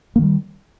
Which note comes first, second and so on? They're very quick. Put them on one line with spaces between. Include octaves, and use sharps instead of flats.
A#3 D#3 G3